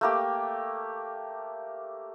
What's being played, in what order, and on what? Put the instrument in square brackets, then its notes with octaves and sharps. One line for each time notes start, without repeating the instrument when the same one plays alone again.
[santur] A3 A#3 G4